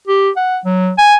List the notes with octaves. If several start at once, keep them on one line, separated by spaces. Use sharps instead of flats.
G4
F#5
F#3
G#5